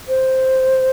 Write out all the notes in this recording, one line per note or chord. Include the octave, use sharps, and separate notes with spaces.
C5